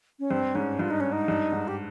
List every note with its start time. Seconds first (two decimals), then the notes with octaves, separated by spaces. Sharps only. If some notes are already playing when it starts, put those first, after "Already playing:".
0.19 C#4
0.31 G2 C4
0.55 G#2 C#4
0.79 G2 F4
0.91 D#4
1.00 C#4
1.12 D#4
1.28 G2
1.52 G#2
1.68 G4